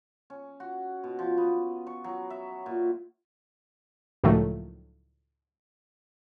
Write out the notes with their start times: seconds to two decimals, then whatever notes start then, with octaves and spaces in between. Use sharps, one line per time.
0.30 C#4
0.60 F#4
1.04 B2
1.19 F3
1.38 B3
1.87 C#6
2.04 F#3
2.30 E5
2.66 A#2
4.24 C#2 A2 D#3 F3 F#3 A3